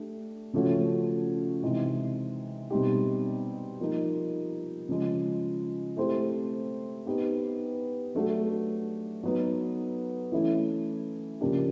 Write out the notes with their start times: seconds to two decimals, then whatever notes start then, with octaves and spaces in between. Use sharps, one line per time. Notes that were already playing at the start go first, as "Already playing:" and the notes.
Already playing: A3 D4 G4
0.53 C#3 F3 A3 C#4 F#4
1.63 C3 E3 G#3 C4 D#4
2.70 B2 G3 C4 D#4 G4
3.80 F3 A#3 D#4
4.89 C#3 F3 G#3
5.97 A3 C4 E4 G4 C5
7.06 B3 D#4 G4 B4
8.15 F#3 A3 D4 F#4 A4
9.23 F#3 B3 D#4
10.32 E3 A3 C#4 E4
11.41 C#3 F3 A#3 D4 G4